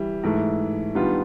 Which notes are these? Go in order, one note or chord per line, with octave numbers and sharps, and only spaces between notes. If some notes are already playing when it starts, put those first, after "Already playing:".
Already playing: E3 G3
G#2 E3 A3
D#3 G3 B3 D4 F4